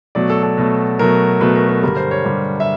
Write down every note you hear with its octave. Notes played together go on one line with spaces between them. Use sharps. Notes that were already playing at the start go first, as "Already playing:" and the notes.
B2 F#3 A3 D5
A4
A4
B2 F#3 A3
B2 F#3 A3 A#4
B2 F#3 A3 B4
A#4
A#4
G2 D3 G3 A#4
C5
C#5
G2 D3 G3
E5